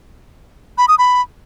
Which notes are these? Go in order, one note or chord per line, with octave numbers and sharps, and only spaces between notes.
B5
D#6
B5